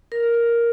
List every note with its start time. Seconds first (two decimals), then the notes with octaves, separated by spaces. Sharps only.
0.12 A#4